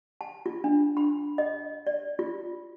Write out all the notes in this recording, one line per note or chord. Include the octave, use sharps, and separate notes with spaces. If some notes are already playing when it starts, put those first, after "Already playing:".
A5
F4
D4
B5
D#5
D5
F4